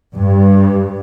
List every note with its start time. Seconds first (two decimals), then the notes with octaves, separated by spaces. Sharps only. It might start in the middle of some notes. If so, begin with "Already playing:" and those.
0.14 G2